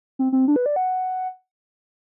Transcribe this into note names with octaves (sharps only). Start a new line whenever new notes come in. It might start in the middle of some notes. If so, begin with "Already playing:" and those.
C4
C4
D4
B4
D5
F#5